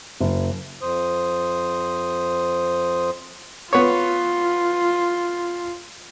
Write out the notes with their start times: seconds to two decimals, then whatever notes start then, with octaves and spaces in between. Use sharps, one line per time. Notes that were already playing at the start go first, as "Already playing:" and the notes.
0.20 F#1
0.82 F2 C5 D#6
3.73 B3 F4 C#5